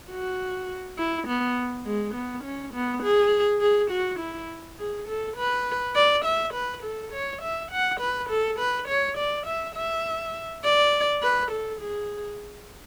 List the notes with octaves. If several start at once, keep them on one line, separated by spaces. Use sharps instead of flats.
F#4
E4
B3
G#3
B3
C#4
B3
G#4
G#4
F#4
E4
G#4
A4
B4
D5
E5
B4
A4
C#5
E5
F#5
B4
A4
B4
C#5
D5
E5
E5
D5
B4
A4
G#4